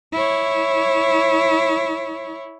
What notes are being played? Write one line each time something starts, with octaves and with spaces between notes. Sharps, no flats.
E4 C#5